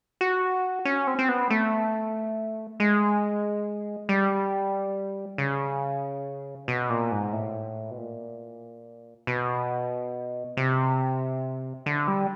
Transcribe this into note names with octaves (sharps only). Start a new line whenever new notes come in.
F#4
C#4
C4
C4
B3
A3
G#3
G3
C#3
B2
A#2
G#2
A2
B2
A#2
B2
C3
D3
G3